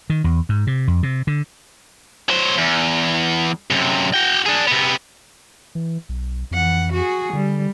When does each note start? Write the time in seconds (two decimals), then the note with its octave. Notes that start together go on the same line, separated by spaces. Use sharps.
0.10 D#3
0.24 E2
0.49 G#2
0.67 C3
0.87 F2
1.03 C3
1.27 D3
2.29 F#3 C5
2.58 E2
3.70 F#2 C3
4.14 F#4 G5
4.46 D4 G#4
4.67 C3 B3
5.75 E3
6.09 B1
6.51 F2 E3 F#5
6.93 F#4 G#4
7.33 D3 G3